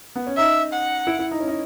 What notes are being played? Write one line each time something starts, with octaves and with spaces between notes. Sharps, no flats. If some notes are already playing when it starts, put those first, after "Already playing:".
B3
C#4
D#4 E5
F#5
E4
E4
D#4
C#4
D#4